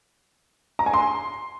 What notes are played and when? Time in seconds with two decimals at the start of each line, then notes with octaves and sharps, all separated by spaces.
0.79 A#5
0.86 G#5
0.93 C6